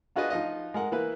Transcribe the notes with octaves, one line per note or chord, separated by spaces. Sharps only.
D4 F4 F#4 G#4 B4 D#5
F3 D#4 F4 D#5
G#3 A#4 F#5
E3 A#3 B4